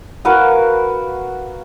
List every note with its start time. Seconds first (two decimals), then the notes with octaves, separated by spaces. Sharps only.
0.25 F#4 A#4 B4 F5